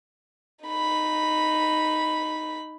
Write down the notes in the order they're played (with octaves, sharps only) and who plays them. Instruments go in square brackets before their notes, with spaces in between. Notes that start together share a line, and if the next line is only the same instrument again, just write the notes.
[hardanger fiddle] D#4 B5